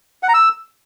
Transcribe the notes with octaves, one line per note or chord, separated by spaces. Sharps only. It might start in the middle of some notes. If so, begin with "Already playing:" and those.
F#5
A#5
E6